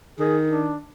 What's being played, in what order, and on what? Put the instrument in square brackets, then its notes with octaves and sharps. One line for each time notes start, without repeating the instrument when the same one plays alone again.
[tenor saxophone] D#3 [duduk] G#4
[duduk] D4